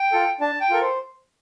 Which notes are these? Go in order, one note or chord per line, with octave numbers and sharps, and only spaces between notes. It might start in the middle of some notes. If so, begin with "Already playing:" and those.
Already playing: G5
F4 A4
D4 A5
G5
F4 A4 A#4
C5